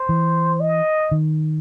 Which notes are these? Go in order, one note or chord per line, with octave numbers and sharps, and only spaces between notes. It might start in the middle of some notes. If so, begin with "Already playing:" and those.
Already playing: C5
E3
D#5
D#3